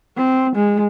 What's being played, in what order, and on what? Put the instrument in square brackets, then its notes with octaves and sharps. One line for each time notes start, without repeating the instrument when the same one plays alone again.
[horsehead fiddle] C4
G#3